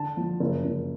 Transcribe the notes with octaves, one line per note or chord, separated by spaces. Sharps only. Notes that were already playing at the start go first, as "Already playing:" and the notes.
Already playing: D3 A5
F3
F#1
F#1